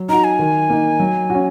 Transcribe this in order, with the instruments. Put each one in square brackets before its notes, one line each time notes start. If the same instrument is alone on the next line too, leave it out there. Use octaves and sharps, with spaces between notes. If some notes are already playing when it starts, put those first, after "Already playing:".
Already playing: [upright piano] F#3
[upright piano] D#4 F#4 [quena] A#5
[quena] G#5
[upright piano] D#3
A#3 D#4
F#3
C#4 F#4